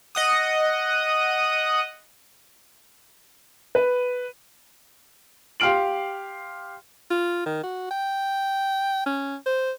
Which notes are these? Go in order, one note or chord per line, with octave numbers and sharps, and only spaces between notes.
D#5 F#5 D#6
B4
G4 F5 C6 F6 D7 F#7
F4
D#3
F#4
G5
C#4
C5